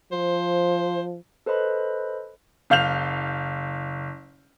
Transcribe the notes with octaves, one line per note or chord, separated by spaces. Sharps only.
F3 C5
A4 B4 C5 D#5 B5
F#1 F5 G6 F7